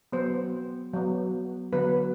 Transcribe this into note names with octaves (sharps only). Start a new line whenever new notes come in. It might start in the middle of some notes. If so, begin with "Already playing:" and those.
F#3 B3 C5
F#3 B3
D3 F#3 B3 B4